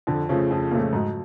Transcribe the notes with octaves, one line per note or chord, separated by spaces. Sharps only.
F2 D3
C#3 F3 A3
F2
A#2 C#3 F3 A3
G#2 F#3